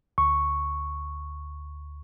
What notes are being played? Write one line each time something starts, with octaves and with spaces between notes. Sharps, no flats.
D2 C#6